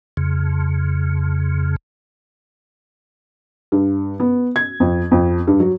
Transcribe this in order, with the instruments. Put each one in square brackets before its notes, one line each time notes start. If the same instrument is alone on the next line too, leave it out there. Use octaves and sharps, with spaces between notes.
[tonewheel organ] F2 C#3
[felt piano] G2
B3
G#6
F2
F2
G2
F#3